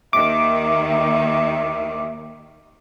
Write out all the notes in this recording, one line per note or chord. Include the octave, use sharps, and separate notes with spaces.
D#2 D#3 E5 D6